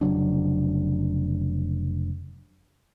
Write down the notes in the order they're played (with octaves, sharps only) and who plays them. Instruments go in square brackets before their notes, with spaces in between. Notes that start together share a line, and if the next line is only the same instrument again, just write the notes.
[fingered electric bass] F1 C#3 F#3 D4